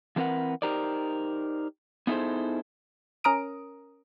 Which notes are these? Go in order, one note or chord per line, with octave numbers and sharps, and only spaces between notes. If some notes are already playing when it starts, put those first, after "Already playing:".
E3 A3 C4 A#4 B4 F#5
D#4 G4 A#4 C5 D5
B3 D#4 E4 G#4 A4 C5
C#4 A#4 A#5 D#6 D7